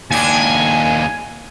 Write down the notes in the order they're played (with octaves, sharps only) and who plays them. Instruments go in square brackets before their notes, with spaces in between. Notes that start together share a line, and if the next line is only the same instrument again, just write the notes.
[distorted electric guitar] D#2 D4 [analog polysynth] G#5